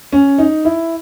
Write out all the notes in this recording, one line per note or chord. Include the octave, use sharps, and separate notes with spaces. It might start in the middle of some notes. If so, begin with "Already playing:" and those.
C#4
D#4
E4